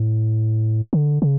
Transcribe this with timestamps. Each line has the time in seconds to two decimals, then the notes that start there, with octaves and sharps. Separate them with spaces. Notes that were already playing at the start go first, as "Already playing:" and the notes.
Already playing: A2
0.93 D3
1.22 C#3